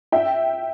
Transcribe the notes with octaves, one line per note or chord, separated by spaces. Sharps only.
E5 G5